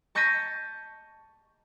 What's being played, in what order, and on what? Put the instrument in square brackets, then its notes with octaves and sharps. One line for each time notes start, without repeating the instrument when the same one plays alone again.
[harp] A5 C#6 G6 A#6 B6 D#7